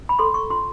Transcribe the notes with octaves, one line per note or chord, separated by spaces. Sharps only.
B5
A4 C6
C#6
F4 C6